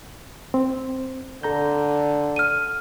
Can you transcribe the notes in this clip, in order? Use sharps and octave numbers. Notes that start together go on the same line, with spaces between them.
C4
D3 A4 A#5 G6
F6 D#7